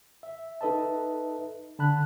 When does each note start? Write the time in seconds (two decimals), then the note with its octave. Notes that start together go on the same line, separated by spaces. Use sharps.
0.23 E5
0.61 D#4 A4 B4 D#5 E5 A5
1.79 D3 A5 B5 F#6